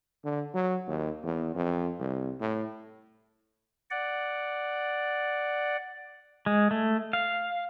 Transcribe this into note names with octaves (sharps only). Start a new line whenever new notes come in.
D3
F#3
D#2
E2
F2
C2
A2
D5 F#5
G#3
A3
F5